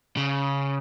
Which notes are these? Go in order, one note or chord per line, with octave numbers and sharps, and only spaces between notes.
C#3